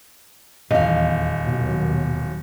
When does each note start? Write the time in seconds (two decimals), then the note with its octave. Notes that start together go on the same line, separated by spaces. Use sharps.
0.71 D#1 E2 D#5 F5
1.42 D#2 B2 F#3